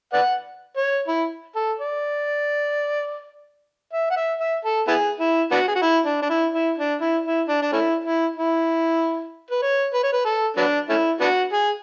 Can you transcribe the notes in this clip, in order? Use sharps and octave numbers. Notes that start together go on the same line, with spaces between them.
B4 D5 F#5
C#5
E4
A4
D5
E5
F#5
E5
E5
A4
B3 E4 G#4
E4
B3 D4 F#4
G#4
F#4
E4
D4
D4
E4
E4
D4
E4
E4
D4
D4
A3 C#4 E4
E4
E4
B4
C#5
B4
C#5
B4
A4
F#3 B3 D4
A3 C#4 E4
B3 D4 F#4
G#4